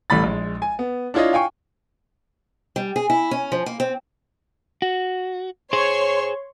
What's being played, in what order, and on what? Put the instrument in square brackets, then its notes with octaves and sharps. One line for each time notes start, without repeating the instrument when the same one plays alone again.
[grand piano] A1 G3 A3 B5 A6
A#1 G#3
G#5
B3
D4 E4 F4 C#5 D#5
F5 G5 G#5 C#6
[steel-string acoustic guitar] G3
G#4
E4
C#4
F3
A#3
C4
[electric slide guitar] F#4
[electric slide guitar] G#4 C5 [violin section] C#5 C6 C#6